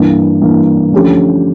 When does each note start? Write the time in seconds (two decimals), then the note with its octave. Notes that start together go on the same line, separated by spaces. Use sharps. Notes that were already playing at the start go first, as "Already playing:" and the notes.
Already playing: G2 E3 A#3
0.41 G2 E3 A#3
0.92 D3 F3 A3 C#4 G4